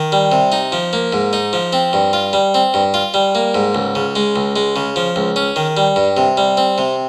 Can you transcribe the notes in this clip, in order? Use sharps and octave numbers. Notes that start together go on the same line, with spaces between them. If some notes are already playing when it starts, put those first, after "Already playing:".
Already playing: D#3
G3
C3
D#4
F3
A#3
G#2
D#4
F3
C4
G2
F4
G3
C4
G2
F4
G3
A#3
G#2
C#2
C#3
G#3
C#2
G#3
C#3
F3
C#2
C#4
D#3
G3
G2
C3
G3
C4
C3